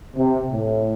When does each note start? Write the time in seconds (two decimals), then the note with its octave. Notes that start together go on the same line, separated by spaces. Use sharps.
0.16 C3
0.51 A2